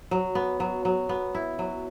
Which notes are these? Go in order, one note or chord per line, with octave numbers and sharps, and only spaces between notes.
F#3
B3
F#3
F#3
B3
E4
F#3